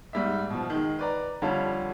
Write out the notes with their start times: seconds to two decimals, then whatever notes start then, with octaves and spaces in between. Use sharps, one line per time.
0.13 G#2 G3 E5
0.50 B2 F3
0.70 D#3 G#3
0.99 B4 D5 A#5
1.42 F2 D3 G3 F4 C#5 A5